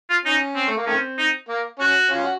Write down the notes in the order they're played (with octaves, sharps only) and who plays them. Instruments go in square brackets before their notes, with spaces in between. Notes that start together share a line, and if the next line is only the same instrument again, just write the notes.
[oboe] F4
[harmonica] C#4 [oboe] D#4
[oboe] C4
[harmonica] A3
A#3
[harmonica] D#3 A3 C4 [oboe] C#4
[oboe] D#4
[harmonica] A#3
[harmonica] C#4 [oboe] F#4
[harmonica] C#4 F4
F#4